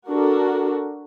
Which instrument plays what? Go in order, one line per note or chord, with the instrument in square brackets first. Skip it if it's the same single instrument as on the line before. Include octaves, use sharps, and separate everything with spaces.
[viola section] D4 F#4 A4 A#4